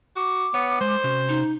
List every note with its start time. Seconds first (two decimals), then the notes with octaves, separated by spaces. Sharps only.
0.16 F#4 D6
0.54 B3 C#5
0.81 G#3 C5
1.04 C3 C#4 F#4
1.28 D#4